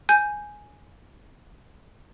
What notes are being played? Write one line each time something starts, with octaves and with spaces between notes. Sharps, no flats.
G#5 G6